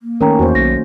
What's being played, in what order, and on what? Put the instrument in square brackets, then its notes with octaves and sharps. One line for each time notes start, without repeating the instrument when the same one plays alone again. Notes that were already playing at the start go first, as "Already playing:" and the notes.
[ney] A#3
[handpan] D#3 A3 C#4 [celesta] A#4 G5 A#5
[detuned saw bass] E2 [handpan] F#4 C5
[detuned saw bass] B1 [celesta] A#6